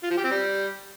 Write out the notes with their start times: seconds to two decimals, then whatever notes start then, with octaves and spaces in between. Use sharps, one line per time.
0.04 F4
0.10 F3
0.17 G4
0.24 C4
0.31 G3